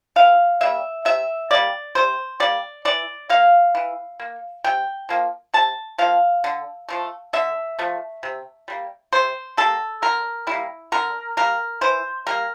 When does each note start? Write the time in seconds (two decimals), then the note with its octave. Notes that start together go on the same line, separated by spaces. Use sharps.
0.16 E3 F5
0.61 G3 A#3 E5
1.05 C3 E5
1.51 G3 A#3 D5
1.95 C3 C5
2.40 G3 A#3 D5
2.85 E3 D5
3.29 A#3 F5
3.75 E3
4.20 A#3
4.64 C3 G5
5.09 F3 A#3
5.54 C3 A5
5.98 F3 A#3 F5
6.44 D3
6.89 F3 A3
7.33 D3 E5
7.79 F3 A3
8.23 C3
8.68 G3 A#3
9.13 C3 C5
9.57 G3 A#3 A4
10.02 D3 A#4
10.47 G3 A#3 E4
10.92 D3 A#4
11.37 G3 A#3 A#4
11.81 E3 C5
12.27 G3 A#3 A#4